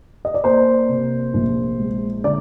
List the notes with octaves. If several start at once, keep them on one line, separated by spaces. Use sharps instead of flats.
D#5
D5
A#3 C5
C3
A#1
G#3
D3 D5